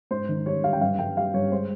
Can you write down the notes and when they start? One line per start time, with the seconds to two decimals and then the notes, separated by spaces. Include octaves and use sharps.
0.11 G#2 C5
0.29 D#3
0.46 G3 C#5
0.64 G3 F5
0.73 G5
0.81 G2 F5
0.99 G2 G5
1.16 G3 F5
1.34 G2 C#5
1.52 G#3 C5